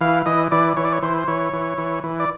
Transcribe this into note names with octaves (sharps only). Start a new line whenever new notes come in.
E3 F5
E3 D#5
E3 D5
E3 C#5
D5
C#5
E3 C5
C5
E3 C#5
E3
E3
E3
D5